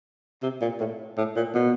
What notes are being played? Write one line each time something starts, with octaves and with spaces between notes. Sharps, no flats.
C3
A#2
A2
A2
A#2
B2